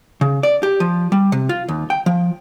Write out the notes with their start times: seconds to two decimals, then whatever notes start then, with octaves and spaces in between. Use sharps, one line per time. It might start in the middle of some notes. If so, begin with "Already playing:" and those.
0.21 C#3
0.43 D5
0.63 G4
0.80 F3
1.12 G3
1.32 C3
1.49 F4
1.69 D#2
1.90 G5
2.06 F3